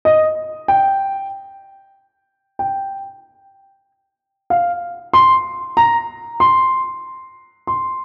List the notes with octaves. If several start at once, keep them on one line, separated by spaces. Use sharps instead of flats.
D#5
G5
G5
F5
C6
A#5
C6
C6